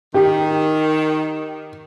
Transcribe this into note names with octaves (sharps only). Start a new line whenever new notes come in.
D#3 G4